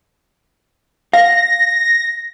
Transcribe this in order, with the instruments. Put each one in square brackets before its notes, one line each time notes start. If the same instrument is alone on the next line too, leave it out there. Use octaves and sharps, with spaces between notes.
[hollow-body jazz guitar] F5 [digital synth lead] A#6